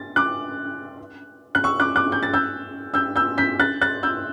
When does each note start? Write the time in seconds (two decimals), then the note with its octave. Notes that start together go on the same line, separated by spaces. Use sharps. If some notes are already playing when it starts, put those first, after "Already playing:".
Already playing: A6
0.16 D6 F#6
1.55 F#6
1.64 C#6 E6
1.80 D6 F#6
1.96 D6 F#6
2.12 G6
2.23 A6
2.34 E6 G6
2.94 E6 G6
3.16 E6 G6
3.38 G6 B6
3.60 F#6 A6
3.81 F#6 A6
4.03 E6 G6